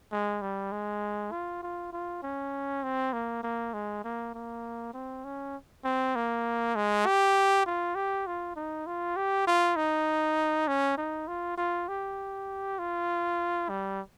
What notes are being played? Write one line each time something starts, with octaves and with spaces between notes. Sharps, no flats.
G#3
G3
G#3
F4
F4
F4
C#4
C4
A#3
A#3
G#3
A#3
A#3
C4
C#4
C4
A#3
G#3
G4
F4
G4
F4
D#4
F4
G4
F4
D#4
C#4
D#4
F4
F4
G4
F4
G3